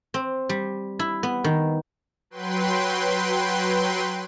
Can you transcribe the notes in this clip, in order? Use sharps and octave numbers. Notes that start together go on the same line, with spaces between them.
C4
G3
E4
B3
D#3
F#3 B4 G5 C6